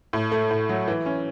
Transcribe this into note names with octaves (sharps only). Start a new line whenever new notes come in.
A2
A3
A2
F#3
E3
C#4